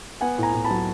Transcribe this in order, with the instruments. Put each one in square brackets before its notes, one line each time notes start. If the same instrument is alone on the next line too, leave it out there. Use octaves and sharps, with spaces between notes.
[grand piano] B3 F#5 G#5
A2 G#5 A#5
A2
A5 B5
F#3